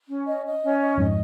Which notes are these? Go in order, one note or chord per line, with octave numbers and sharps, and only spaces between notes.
C#4
D#5
D#5
C#4
D#5
F2 G#2 D#5